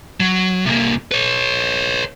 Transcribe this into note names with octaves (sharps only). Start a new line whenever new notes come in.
F#3
C2 A#3
B4 C#5